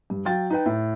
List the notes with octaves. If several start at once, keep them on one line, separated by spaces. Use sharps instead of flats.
G2
F#3 F5 G5 A6
D#4 B4 G5
A2